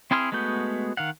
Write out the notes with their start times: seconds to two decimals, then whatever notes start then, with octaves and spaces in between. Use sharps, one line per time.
0.11 C4 E4 G#4 C6 F6
0.32 G#3 A3 B3 F#4 G6
0.97 D#3 F5 F#5